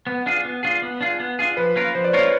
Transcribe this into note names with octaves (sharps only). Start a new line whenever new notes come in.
B3
D4 F4 G#4
B3
D4 F4 G#4
B3
D4 F4 G#4
B3
D4 F4 G#4
F3 B4
A#3 C#4 F4 A#4
F3 C5
D5
A#3 C#4 F4 A#4 C#5